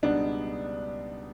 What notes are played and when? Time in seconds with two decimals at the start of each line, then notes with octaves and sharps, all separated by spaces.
0.03 C#2 B2 G3 B3 D4 D#4